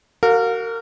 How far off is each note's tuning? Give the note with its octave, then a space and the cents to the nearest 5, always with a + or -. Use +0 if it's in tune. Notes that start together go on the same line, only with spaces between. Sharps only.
F#4 +35 A#4 -25 F5 +35